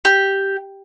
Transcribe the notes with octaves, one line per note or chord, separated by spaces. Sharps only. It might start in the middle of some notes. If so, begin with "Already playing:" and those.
G4